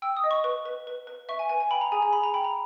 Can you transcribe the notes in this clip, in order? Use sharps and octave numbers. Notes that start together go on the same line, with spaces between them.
G5 E6
D#6
D#5
C#6
B4 C#6
B4
B4
B4
E5 C#6
G#5
B4 G#5
G#5
G5 B5
A#5
G#4 G#5
G#5
G#4 B5
A#5
G5 B5
A#5